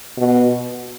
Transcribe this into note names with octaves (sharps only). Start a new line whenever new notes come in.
B2